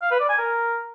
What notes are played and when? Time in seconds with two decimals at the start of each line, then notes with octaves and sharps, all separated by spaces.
0.02 F5
0.11 B4
0.20 D5
0.29 G#5
0.38 A#4